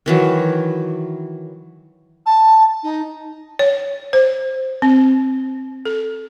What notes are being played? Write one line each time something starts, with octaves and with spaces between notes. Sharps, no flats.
D#3 E3 F#3
A5
D#4
C#5
C5
C4
A4